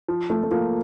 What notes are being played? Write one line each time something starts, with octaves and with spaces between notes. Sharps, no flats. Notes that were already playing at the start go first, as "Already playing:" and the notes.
F3
F3 A3
A3
F3 A#3